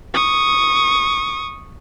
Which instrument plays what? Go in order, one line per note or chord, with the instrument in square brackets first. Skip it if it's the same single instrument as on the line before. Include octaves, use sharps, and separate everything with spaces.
[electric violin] C#6 D#6